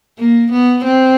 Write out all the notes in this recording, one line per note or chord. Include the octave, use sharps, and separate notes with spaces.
A#3
B3
C4